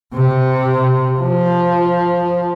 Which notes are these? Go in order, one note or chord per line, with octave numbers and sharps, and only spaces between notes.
C3
F3